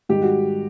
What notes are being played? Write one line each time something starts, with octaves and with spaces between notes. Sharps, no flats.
G#2 D#3 G3 G4
F#4